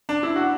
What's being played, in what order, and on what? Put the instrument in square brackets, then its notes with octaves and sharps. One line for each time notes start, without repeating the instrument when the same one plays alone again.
[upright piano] D4
E4
F#4